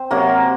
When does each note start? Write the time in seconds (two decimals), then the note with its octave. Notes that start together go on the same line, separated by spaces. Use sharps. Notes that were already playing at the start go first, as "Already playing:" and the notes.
Already playing: C4 C5
0.11 C3 F#3 A#3 A#4